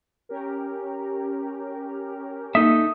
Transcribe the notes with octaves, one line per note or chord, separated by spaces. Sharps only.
C#4 G4 A#4
A#3 D#4 A4 E5 D#6